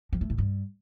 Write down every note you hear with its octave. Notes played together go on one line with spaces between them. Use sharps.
F3
A3
A2
G2